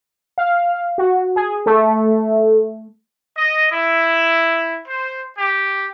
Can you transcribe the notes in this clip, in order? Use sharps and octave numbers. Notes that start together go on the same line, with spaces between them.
F5
F#4
G#4
A3
D#5
E4
C5
G4